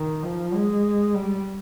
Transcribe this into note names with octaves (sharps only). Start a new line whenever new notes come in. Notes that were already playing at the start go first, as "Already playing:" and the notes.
Already playing: D#3
F3
G#3
G3